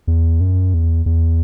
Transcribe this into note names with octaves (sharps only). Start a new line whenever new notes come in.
E2
F#2
E2
E2